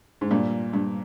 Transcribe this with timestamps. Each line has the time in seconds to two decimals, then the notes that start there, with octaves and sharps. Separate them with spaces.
0.21 G#2
0.31 G2 A#2
0.73 G2